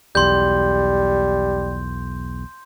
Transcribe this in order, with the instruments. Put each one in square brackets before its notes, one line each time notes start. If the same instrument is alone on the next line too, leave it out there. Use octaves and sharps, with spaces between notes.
[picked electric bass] B1 E2 [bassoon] G3 [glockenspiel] C6 G6